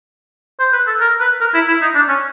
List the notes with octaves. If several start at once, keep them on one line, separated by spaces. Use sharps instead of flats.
C5
B4
A4
A#4
B4
A#4
E4
E4
D#4
D4
C#4